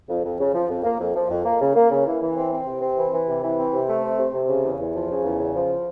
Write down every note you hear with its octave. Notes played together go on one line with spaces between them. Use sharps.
F2
F2
C#3
F3
F2
A#3
F2
F3
F2
A#3
C#3
A#3
C#3
E3
E3
C4
C4
C3
C4
E3
E3
C3
E3
C4
C3
A3
C4
C3
C3
C#3
E2
E2
F3
C#3
E2
C#3
F3